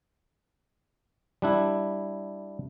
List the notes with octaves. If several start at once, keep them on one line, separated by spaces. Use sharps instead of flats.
G3 D4 E4